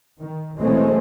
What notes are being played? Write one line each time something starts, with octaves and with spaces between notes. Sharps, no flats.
D#3
B2 E3 G#3 A3 C4 C#4